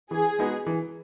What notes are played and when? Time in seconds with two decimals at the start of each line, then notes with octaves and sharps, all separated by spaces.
0.11 E3 G#4
0.38 G#3 B3 D#4 F#4
0.66 E3